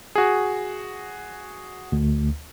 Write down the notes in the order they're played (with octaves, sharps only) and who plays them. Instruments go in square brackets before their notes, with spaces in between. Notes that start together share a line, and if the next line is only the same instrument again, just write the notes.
[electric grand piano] F#4 G#4
[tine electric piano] D2